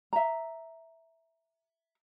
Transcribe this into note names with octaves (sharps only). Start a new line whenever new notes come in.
E5 A#5